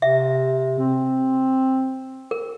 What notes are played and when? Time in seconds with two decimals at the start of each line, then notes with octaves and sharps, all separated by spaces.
0.02 C3 E5
0.78 C4
2.31 A#4